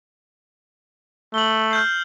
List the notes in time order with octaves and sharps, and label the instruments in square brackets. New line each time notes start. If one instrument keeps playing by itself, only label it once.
[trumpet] A3 [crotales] F#7 G7
[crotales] F6 G6 C7